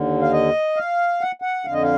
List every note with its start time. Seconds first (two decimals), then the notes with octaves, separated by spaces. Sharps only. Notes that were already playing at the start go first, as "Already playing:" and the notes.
Already playing: D#2 D3
0.21 F5
0.32 D#5
0.76 F5
1.21 F#5
1.42 F#5
1.65 F2 D3 F5
1.74 D#5
1.83 F5